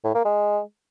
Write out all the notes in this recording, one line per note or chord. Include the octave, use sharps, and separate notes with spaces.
A2
A#3
G#3